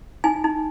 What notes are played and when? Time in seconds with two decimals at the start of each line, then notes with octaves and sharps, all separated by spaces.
0.24 D#4 G#5
0.44 D#4